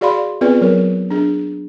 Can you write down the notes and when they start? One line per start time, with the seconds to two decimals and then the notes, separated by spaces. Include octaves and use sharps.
0.01 F#4 G#4 D5 F5 B5 C6
0.41 B3 C4 F4 G#4 B4 D5
0.61 F#3 A#4
1.11 D4 G#4